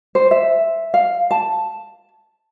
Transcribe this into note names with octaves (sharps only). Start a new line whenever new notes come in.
C5
E5
F5
A5